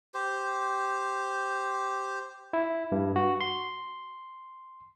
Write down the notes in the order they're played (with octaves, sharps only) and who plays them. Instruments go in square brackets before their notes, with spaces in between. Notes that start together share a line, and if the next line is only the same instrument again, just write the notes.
[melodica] G4 C5
[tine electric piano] E4
G2
F#4
C6